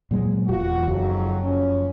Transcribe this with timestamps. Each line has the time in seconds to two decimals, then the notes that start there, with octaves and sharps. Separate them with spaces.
0.11 A#2 F#3 G#3
0.48 E1 E2 F4 F#4
0.88 F#1 F2 G#2 F#3
1.43 F3 C#4